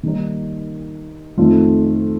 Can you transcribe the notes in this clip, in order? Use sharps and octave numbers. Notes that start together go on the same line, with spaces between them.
D#3 G3 A#3 D#4
F2 D#3 A3 C4 F4